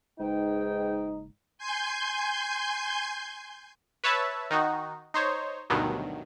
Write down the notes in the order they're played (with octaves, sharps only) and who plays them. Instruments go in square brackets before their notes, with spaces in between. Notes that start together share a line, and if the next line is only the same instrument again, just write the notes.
[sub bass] F#1 [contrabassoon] G#2 [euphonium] D#4 [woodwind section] G#4 B4 G5
[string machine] G#5 C6 G6
[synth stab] B4 C#5 E5 A5 B5
D#3 D#4 F#4
D#4 C5 C#5
D2 G2 B2 D#3 F#3